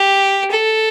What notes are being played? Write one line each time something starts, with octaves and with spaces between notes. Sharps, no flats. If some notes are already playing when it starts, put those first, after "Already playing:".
Already playing: G4
A4